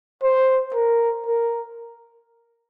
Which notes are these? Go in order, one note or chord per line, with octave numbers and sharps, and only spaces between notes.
C5
A#4
A#4